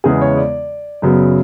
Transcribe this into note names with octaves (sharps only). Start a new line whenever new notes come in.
E2 C#3 E3 G#3 B3 G#4
C#5
D5
F#2 C#3 F#3 B3